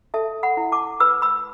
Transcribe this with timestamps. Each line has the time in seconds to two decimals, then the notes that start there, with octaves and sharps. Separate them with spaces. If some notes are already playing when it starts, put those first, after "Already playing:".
0.14 A4 E5 A5
0.43 F#5 B5
0.57 E4
0.72 A5 D6
1.00 B4 B5 E6
1.22 B5 E6